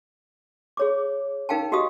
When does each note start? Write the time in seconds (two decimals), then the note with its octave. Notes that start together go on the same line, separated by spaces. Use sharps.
0.77 G#4 C#5 D6
1.49 D#4 A#4 F5 G5 A5
1.72 F#4 G4 D#5 F5 D#6